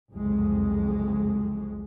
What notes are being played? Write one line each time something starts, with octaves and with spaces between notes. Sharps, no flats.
F#1 C2 F2 G#3